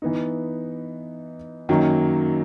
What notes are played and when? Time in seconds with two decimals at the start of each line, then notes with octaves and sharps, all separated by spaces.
0.02 E3 B3 D#4
1.69 F#2 D#3 F#3 A#3